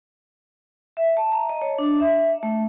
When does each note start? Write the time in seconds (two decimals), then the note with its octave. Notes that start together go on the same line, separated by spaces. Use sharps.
0.97 E5
1.17 A5
1.32 A#5
1.49 D#5
1.62 C#5
1.78 D4
2.00 E5
2.43 A3